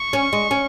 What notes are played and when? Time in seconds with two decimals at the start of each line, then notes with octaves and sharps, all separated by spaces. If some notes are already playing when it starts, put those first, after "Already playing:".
Already playing: C#6
0.13 C#4
0.33 G#3
0.51 C#4